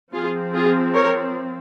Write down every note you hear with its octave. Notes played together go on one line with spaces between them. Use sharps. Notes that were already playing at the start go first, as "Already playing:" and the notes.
F3 C4 F4 G#4
F4 G#4
A#4 C#5